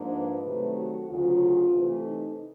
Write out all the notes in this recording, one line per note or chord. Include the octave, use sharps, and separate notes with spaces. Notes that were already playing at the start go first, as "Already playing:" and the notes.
Already playing: G#2 F3 A#3 D4
B4
C3 D#3 F#3 A3
F#4
D2 C#3 F#3 F4
C3 E3 A3
D#4